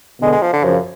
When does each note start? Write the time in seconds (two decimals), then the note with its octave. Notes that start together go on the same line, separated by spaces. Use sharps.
0.21 B2 D3 G#3
0.32 G#3
0.42 F3
0.53 D3
0.63 F#2 C#3 F3